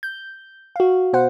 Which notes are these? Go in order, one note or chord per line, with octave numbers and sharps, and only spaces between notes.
G6
F#4 F5
B2 C5 F#5